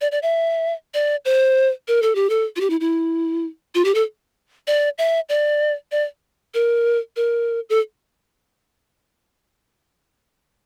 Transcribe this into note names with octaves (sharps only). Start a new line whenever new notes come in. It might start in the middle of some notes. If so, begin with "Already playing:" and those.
D5
D5
E5
D5
C5
A#4
A4
G4
A4
F4
G4
E4
E4
F4
G4
A4
D5
E5
D5
D5
A#4
A#4
A4